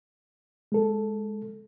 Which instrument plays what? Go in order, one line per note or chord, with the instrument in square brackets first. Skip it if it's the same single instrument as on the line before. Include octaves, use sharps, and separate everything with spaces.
[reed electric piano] G#3 A4